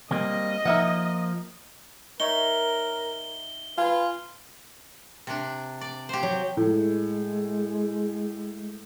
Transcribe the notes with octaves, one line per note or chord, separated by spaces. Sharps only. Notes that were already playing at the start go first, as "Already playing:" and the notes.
G3 A#3 C4 D#5
F3 A#3 D#4 E5 F#5
D#4 A#4 C#5 E5 G7
F4 B4 G#5
C3 D4
D5
G4 C5
F#3
A2 G#3